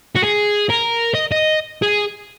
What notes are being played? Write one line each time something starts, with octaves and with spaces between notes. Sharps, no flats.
F#4
G#4
A#4
D#5
D#5
G#4